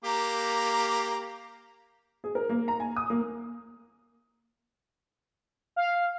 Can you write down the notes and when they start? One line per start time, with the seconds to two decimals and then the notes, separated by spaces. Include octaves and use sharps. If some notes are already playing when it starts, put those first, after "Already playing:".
0.04 A#3 G4 A#5
2.24 G#4
2.35 A#4
2.49 A#3
2.68 A#5
2.80 G#5
2.96 D#6
3.10 A#3
5.76 F5